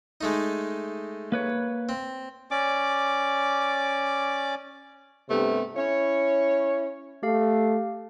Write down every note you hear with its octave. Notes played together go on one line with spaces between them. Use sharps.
G#3 A3 D#4
A#3 B4 C#5
C4
C#4 D5 D6
G2 C3 A3 B3 C4
C#4 E4 C#5
A3 G4 F5